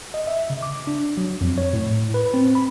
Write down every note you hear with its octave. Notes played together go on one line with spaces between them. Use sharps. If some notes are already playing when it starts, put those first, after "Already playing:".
D#5
E5
C#3
D6
D4
F#3
F2
C#5
A2
B4
C4
B5